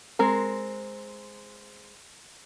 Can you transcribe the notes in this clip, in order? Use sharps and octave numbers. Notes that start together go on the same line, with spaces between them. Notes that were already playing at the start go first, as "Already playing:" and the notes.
G#3 C4 A#4